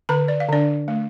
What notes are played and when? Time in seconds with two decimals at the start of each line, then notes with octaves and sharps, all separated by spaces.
0.09 D3 B4 B5
0.28 D5
0.40 F5
0.49 D3 D4 D5
0.88 A3